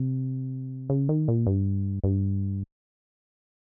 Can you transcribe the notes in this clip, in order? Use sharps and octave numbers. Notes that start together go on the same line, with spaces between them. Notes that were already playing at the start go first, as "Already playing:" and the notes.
Already playing: C3
C#3
D#3
A#2
G2
G2